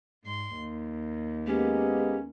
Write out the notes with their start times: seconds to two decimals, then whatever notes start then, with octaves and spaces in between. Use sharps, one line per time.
0.25 G#2 C6
0.58 D#2
1.47 G#3 A#3 B3 C#4 G4